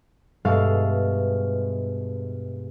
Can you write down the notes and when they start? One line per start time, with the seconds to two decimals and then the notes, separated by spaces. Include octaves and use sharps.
0.45 G2 B2 G#3 E5 F5 A6